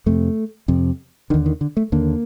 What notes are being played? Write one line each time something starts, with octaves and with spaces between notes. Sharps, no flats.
F2 C3 A3
F2 C3
D#2 D3 D#3
D#3
D3
A3
D#2 D3 A#3